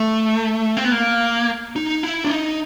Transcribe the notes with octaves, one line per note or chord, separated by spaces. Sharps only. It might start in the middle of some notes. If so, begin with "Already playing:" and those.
Already playing: A3
C4
B3
A#3
D#4
E4
D4
D#4